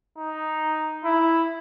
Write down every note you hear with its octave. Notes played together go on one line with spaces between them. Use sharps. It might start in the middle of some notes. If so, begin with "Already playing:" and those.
D#4
E4